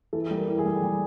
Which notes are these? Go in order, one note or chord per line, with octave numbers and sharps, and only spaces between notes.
E3 A4
G3
A#4
E3
G#4
G3
G3